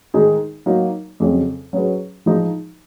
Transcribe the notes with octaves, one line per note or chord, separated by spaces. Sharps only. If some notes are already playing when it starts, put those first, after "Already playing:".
D#3 G#3 D#4 G#4
F#3 A#3 D#4
F2 C#3 F#3
F#3 C#4 G#4 B4
F3 G#3 D#4